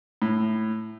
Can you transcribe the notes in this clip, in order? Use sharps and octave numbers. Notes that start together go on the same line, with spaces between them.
A2